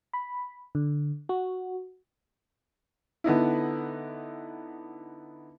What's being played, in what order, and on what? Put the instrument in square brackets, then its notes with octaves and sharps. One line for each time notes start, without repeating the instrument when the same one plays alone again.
[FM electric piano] B5
D3
F#4
[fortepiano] D3 B3 D#4 E4